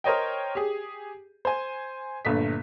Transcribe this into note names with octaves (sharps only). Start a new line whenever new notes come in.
A#4 C5 C#5 D#5 G5
G4 G#4
C5 G#5
G1 G2 A#2 A3 B6